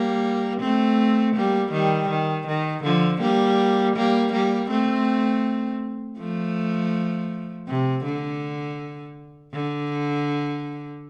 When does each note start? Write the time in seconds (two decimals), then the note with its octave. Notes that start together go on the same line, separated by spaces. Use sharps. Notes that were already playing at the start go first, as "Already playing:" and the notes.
Already playing: G3 A#3
0.61 A3 C4
1.35 G3 A#3
1.72 D#3 G3
2.10 D#3
2.47 D#3
2.84 D3 F3
3.21 G3 A#3
3.96 G3 A#3
4.33 G3 A#3
4.70 A3 C4
6.18 F3 A3
7.68 C3
8.04 D3
9.53 D3